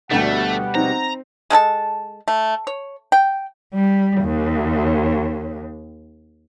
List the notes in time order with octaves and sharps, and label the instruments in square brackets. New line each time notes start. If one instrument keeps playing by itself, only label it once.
[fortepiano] D2 D3 [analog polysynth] B2 G3 [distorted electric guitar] A3 [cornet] F#5
[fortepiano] C4 D#4 [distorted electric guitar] A#5
[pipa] G#3 A3 A4 A5
A3
C#5
G5
[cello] G3
D#2